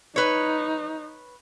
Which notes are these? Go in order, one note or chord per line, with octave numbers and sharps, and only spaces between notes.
D#4 B4 C#5